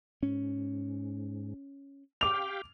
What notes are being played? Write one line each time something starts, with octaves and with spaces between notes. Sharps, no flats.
G#2 C#4
G4 F5 G5 D6 F7